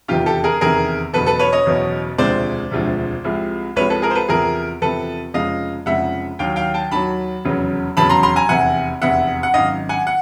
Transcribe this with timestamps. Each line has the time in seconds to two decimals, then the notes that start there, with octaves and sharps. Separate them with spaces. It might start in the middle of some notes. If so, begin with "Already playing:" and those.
0.08 F1 E2 C3 D#3 F4 G4
0.26 G4 A4
0.44 G#4 A#4
0.61 F1 E2 C3 D#3 G#4 A#4
1.13 F#1 E2 B2 A4 B4
1.26 A4 B4
1.39 B4 C#5
1.52 C#5 D#5
1.66 F#1 E2 B2
2.18 E1 D2 C3 F3 G#3 C5 D5
2.71 E1 D2 C3 F3 G#3
3.24 C2 C3 F3 G#3
3.76 C2 C3 F3 G#3 B4 C#5
3.90 A4 B4
4.02 G#4 A#4
4.11 C5
4.15 A4 B4
4.29 E2 C3 F3 G#4 A#4
4.82 E2 C3 F3 A4 B4
5.34 F1 F2 C#3 F3 G#3 D#5 F5
5.86 F1 F2 C#3 F3 G#3 E5 F#5
6.39 D#2 D#3 F#3 F5 G5
6.56 F5 G5
6.74 G5 A5
6.91 D#2 D#3 F#3 A5 B5
7.45 F1 E2 C#3 F#3
7.97 F1 E2 C#3 F#3 A5 B5
8.09 A#5 C6
8.23 A#5 C6
8.36 G#5 A#5
8.49 F1 E2 C3 F#5 G#5
9.02 F1 E2 C3 E5 F#5
9.43 F#5
9.54 G#1 F#2 D#3 D#5 F5
9.89 F#5 G#5
10.07 F#5